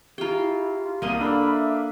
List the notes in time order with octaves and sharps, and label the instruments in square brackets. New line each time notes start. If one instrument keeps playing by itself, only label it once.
[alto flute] E4 [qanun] F4 G5 [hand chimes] G4 G#4 A#5
[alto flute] E4
F4
[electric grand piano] C2 D#7 [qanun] A#3 D#5
[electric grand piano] D4 F5 [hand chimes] A4 E6 F6 [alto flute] B5
[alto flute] E5